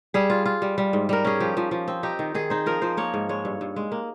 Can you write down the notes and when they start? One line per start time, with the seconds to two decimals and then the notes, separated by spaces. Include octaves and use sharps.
0.14 G3 G#4
0.30 F4
0.46 F4
0.62 G3
0.78 G3
0.93 G#2
1.09 G3 A#4
1.25 C#4 G#4
1.40 F3 G4
1.57 F3
1.71 F3
1.88 C4
2.03 D#4 G4
2.19 D#3
2.34 D#3 G#4
2.50 D#4 C5
2.66 F3 A#4
2.82 F3 C5
2.97 A#3 C#5
3.14 G#2
3.29 G#3 C#5
3.45 G2
3.61 G2
3.76 G#3
3.92 A#3